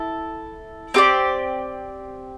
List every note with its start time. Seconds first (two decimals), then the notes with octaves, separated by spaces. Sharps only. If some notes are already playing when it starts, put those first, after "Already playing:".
Already playing: E4 A4
0.94 C4 G4 D5